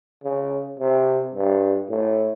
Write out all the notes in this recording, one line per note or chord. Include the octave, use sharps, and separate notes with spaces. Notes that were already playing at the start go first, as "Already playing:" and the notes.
C#3
C3
G2
A2